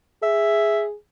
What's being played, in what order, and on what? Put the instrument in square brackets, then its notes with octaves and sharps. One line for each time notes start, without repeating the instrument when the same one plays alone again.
[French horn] G#4 [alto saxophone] E5